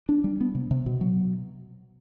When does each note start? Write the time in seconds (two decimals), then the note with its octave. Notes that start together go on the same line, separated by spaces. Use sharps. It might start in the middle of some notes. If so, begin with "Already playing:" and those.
0.09 D4
0.24 G3
0.41 B3
0.55 C3
0.71 C3
0.86 B2
1.01 F#3